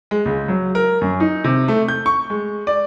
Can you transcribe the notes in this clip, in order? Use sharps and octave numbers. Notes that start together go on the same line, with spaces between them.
G#3
C#2
F#3
A#4
F#2
D#4
C3
A3
G6
C#6
G#3
D5